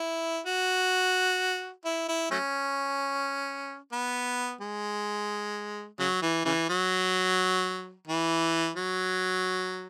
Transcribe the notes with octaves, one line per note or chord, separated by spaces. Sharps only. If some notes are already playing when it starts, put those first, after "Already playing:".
Already playing: E4
F#4
E4
E4
F#3 A3 C#4
B3
G#3
C#3 F#3
E3
C#3 E3
F#3
E3
F#3